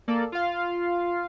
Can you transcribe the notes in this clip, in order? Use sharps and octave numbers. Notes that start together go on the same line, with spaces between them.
A#3 A4 D5
F4 F5